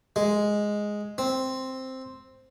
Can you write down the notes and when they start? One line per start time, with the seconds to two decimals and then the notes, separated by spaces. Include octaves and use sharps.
0.16 G#3
1.18 C4